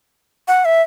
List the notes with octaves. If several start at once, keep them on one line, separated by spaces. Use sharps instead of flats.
F#5
E5